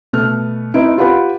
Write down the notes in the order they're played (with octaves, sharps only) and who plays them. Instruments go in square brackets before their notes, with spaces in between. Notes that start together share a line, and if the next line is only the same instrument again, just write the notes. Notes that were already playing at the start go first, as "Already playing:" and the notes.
[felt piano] B2 A3 B3 F6
C4 D#4 E4 B4 D7
F4 G4 B4 F#5 B5